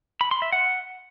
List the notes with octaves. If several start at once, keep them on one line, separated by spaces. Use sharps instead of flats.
B5
C6
E5
F#5